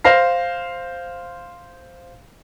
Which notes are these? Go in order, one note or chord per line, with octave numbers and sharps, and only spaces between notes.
C5 F5 A#6 C7